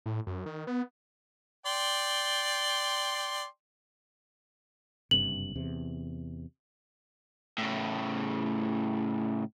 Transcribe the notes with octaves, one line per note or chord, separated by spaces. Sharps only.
A2
F#2
D#3
B3
D5 G5 C6
F#1 G2 C3 F#7
E2 C3
A2 C#3